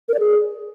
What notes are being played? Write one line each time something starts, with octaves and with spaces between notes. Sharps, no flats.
A#4
D5
G#4